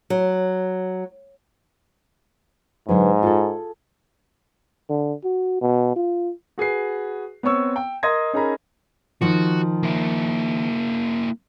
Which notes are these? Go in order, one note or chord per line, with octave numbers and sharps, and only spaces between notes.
F#3
G#2 D3 F#3 B4
F4 G#4 A4
D3
F#4
B2
F4
F#4 G#4 B4 C7
B3 C4 C#5 C#6 E6
G5
A#4 D#5 C6 D#6 G#6 A#6
C#4 D#4 G#4 A#4 A#5 B5
D#3 F3 F#4
A#3 E4